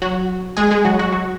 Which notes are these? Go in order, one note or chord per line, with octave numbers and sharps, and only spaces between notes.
F#3 F#4
G#3 G#4
G#3 G#4
F#3 F#4
F#3 F#4
F#3 F#4